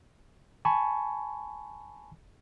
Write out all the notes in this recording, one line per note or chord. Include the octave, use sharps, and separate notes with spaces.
G#5 A5 B5 C#6